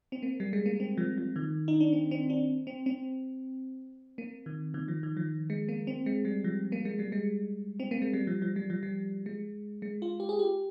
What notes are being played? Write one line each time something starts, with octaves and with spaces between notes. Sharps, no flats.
C4
A#3
G3
G#3
A#3
C4
F3
F3
D#3
D#4
D4
C4
C4
D4
C4
C4
A#3
D#3
D#3
F3
D#3
F3
G#3
A#3
C4
G#3
G3
F3
A#3
G#3
G3
G#3
C4
A#3
G#3
G3
F3
F3
G3
F3
G3
G#3
G#3
F4
G4
G#4
G4